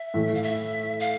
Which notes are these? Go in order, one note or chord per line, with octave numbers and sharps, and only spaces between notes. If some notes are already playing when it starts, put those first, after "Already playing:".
Already playing: E5
A2 E3 A3
F5
E5
F5